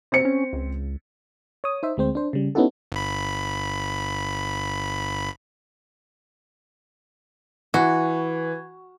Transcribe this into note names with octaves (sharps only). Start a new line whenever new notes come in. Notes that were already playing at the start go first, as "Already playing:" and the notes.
C3 C4 C#7
C#4
C#2
C#5 D#6
D#4 C5 E5
D2 G#3 C4 C5
D4 C5
C#3 G3
B3 C#4 D#4 E4 F#4 A4
G1 B5
E3 F#4